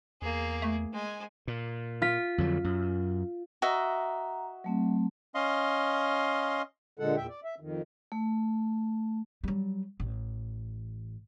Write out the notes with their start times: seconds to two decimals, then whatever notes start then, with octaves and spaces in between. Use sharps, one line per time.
0.22 E2 A#3 G#4
0.62 A3
0.93 G#3 G#5
1.48 A#2
2.02 F4 B6
2.38 F2 D3 F#3
2.64 F#2
3.62 F#4 D#5 E5 F#5 A#5
4.64 F#3 A3 C4
5.35 C#4 D#5 F5 C6
6.99 A#2 D3 G#3 A4 F#5
7.17 E2 A#2 E5 G5
7.29 D5
7.44 E5
7.60 F2 D#3
8.12 A3
9.44 F#3 G3
10.00 A1